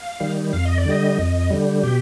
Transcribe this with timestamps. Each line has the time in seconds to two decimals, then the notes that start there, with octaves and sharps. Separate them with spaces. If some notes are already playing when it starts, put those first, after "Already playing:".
Already playing: F5
0.20 D#3 G3
0.53 F2 F5
0.65 D#5
0.78 D5
0.86 D3 G3 D#5
1.18 F2
1.50 D3 G3
1.83 B2 G4